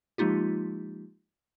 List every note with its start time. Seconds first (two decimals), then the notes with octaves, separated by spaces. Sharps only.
0.18 F3 G#3 A#3 D#4 F4 G4